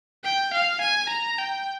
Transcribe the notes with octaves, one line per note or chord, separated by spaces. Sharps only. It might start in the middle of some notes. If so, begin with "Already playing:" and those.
G5
F5
G#5
A#5
G5